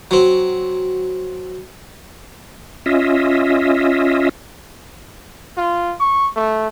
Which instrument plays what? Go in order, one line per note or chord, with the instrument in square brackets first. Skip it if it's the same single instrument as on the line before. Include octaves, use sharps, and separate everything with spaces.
[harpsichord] F#3 C4
[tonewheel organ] C#4 F4 D#5 E5
[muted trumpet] F4
C#6
A3